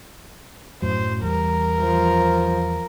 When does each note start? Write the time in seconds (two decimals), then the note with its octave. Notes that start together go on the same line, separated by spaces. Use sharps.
0.82 F#2 A2 F#3 C5
1.23 E2 G3 A#4
1.80 F3